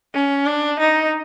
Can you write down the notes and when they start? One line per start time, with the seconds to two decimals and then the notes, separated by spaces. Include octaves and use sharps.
0.14 C#4
0.46 D4
0.80 D#4